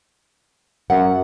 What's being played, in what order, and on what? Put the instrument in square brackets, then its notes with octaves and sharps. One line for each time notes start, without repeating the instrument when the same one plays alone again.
[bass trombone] F#2 [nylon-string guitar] F#5